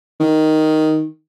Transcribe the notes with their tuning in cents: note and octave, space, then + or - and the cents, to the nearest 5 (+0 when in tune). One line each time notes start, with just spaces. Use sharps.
D#3 +0